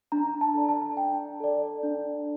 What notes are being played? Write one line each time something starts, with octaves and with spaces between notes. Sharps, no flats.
D4 A#5
A5
A4 D5
A5
D4 G5
A4 D5
D4